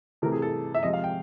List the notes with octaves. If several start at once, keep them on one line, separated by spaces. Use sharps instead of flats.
C3 E3 A3 A#4
G#4
A4
E5
C3 F3 G#3 D#5
F5
G5